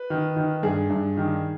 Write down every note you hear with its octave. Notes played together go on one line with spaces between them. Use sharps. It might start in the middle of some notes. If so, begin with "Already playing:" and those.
Already playing: B4
D#3
D#3
G2 G#4
G2
D#3